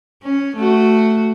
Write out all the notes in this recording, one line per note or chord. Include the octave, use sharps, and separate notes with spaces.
C#4
A3 F#4